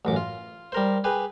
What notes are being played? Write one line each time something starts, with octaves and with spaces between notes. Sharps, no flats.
A1 F#2 D6
F4
G3 A#4 C5
G4 G#4 B4